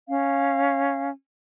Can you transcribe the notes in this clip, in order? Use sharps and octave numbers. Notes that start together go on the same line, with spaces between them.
C#4 F5